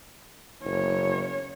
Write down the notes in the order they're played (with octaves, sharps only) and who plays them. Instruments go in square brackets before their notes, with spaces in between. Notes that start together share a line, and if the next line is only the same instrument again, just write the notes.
[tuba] F#1 [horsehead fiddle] C#5